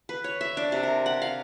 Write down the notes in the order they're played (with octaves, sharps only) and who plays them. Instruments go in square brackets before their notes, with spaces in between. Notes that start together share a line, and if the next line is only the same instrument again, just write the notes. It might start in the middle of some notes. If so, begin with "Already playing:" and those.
[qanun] B4
C#5
E5
D4
C3
A#4
F#5
F5